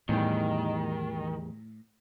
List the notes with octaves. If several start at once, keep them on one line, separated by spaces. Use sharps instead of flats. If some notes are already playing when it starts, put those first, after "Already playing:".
E2 A2 D#3 G3